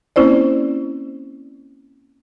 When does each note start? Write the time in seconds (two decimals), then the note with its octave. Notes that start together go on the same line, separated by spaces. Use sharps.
0.16 A#3 C4 C#4 E4 C5 D5